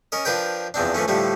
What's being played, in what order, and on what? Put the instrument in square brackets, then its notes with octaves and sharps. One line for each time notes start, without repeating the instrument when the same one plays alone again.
[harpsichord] C#4 A#4 D#5
F3 D4 A#4 B4 G5
E2 F3 C4 D4
E3 F3 A3 C#4
A2 D3 F3 G3 A3